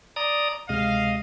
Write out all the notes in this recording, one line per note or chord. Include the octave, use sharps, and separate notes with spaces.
D5 A#5 D#6
D2 C3 G#3 D#5 F5